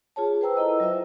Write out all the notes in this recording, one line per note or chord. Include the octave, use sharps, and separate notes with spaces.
F4 G#4 C#5 A5
B4 C5 G5 A#5 E6
E4 A4 D#5
F#3 E4 F4 C5 E5